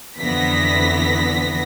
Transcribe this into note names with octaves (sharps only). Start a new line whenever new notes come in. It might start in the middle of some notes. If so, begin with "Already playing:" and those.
F2 D3 E3 B3 A#6 B6